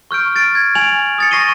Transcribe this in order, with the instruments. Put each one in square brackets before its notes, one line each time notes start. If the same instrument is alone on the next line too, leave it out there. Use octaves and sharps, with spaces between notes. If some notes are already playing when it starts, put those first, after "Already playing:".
[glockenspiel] C#6 F6 G6 D7
A6 D7
G#6
G#5 G#6 D7 F7 F#7
D#6 A6 C#7
C#6 A#6 C7 D#7 G7